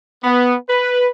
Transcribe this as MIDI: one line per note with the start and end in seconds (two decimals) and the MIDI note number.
0.24 0.55 59
0.69 1.08 71